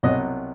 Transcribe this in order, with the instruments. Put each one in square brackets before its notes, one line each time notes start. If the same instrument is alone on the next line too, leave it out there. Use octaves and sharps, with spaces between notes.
[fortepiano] C2 B2 F#3 D#5